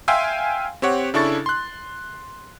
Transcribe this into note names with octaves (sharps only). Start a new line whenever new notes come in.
E5 F5 G5 G#5 C6 E6
C4 G4 C#5 F#5
C#3 D4 E4 A4 C#6 A6
C6 F#6